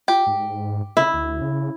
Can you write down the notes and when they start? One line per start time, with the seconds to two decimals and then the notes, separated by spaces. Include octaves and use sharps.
0.08 F4 G4
0.27 G#2
0.97 C#3 E4
1.13 D2
1.41 C#3